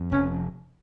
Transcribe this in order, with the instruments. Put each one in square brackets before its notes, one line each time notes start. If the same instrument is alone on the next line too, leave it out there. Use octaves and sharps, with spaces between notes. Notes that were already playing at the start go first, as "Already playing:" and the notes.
Already playing: [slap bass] F2
[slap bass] F1 [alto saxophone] C#4